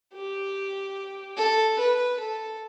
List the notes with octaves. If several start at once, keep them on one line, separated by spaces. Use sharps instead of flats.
G4
A4
B4
A4